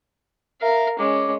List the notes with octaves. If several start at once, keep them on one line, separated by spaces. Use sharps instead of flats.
A#4 E5 F5
G#3 C#4 D6